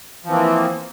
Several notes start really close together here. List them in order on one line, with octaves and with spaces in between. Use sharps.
F3 E3 C4 A#3